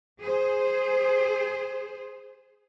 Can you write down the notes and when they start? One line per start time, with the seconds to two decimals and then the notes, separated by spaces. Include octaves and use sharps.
0.20 G#4 C5